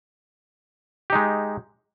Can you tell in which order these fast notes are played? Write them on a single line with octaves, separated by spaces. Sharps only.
G4 D#4 G#3